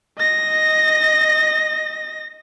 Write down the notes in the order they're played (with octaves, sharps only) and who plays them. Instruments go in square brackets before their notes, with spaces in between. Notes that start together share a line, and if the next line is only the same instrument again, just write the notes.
[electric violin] D#5 A#6